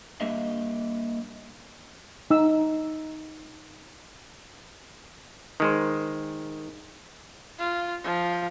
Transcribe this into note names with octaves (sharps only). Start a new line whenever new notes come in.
G3 A#3 D4 D#5 E5
D#4 E6
D#3 G#3 C5
F4
F3